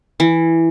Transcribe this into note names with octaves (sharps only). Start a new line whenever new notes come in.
E3